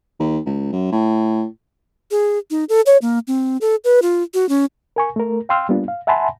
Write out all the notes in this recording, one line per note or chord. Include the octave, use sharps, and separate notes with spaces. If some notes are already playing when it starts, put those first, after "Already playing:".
D#2
C#2
F#2
A2
G#4
D#4
A4
C#5
A#3
C4
A4
B4
F4
F#4
C#4
A#4 G#5 C#6
A3 A#4
F5 G5 C6 E6 F6
G3 A#3 B3 D4 F4
F5
E5 F#5 G#5 A5 B5 C6